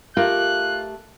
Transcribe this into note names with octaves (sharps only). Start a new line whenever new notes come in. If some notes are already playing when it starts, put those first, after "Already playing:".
A3 F4 G4 A#4 F#6